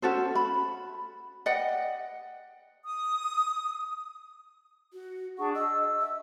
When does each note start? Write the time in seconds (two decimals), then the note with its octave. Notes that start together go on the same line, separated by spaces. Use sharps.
0.02 C#4 F#4 A4 C5
0.35 B5
1.46 D5 D#5 F#5 G5
2.84 D#6
4.93 F#4
5.38 D4 G#4 F#5 C#6
5.55 D#5 E6
6.01 E5